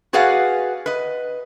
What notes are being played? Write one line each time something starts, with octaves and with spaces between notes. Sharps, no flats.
F#4 G#4 B4 D5 F5 F#5
B4 D#5